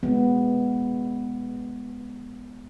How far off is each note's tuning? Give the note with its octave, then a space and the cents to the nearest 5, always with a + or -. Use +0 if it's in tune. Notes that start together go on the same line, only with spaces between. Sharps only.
G#3 +0 B3 +0